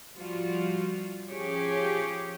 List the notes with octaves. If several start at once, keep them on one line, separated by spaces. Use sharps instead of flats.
F3 G3 F4 F#4
F3 C#4 G4 G#4 C#5